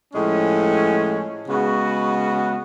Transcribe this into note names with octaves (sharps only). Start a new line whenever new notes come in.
A2 F3 G#3 C#4
C#3 G#3 B3 F#4